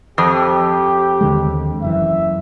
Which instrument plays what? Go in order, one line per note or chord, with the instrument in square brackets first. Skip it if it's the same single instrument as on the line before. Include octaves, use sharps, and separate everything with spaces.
[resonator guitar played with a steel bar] F2 [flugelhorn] G4
[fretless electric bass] D#2 D3 G#3
[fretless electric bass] F#1 F#2 E3 [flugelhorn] E5